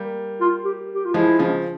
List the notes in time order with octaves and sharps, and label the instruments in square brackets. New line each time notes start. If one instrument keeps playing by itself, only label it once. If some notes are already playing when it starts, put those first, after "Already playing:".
Already playing: [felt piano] G3 A#3
[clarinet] F4
G4
G4
F4
[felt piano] F3 G#3 [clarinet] E4
[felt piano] C#3 F3